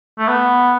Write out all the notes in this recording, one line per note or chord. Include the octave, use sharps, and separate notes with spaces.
A3
B3